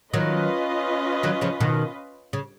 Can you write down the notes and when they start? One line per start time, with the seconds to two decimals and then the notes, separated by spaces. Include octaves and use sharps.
0.13 D#3 F#3 C#4 F4 B4 D#5
1.23 D#3 F#3
1.41 C#3 F3
1.60 B2 D#3
2.33 C#3